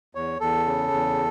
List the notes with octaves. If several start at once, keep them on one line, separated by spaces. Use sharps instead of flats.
E2 C#5
E2 A4
C#3
E2